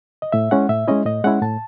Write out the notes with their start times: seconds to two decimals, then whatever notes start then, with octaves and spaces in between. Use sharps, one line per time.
0.22 D#5
0.32 A2 E5
0.51 G#3 C#4 E4 F#5
0.69 A2 E5
0.88 G#3 C#4 E4 D#5
1.06 A2 D#5
1.24 G#3 C#4 E4 F#5
1.42 A2 A5